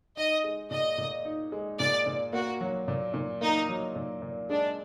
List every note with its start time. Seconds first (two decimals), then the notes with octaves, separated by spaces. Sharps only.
0.17 D#4 D#5
0.44 G#3
0.71 A#2 D#5
0.98 A#2
1.25 D#4
1.52 G#3
1.79 A#2 D5
2.06 A#2
2.33 A#3 F#4
2.61 F#3
2.88 A#2
3.14 A#2
3.41 A#3 D#4
3.69 F#3
3.95 A#2
4.22 A#2
4.49 G#3 D4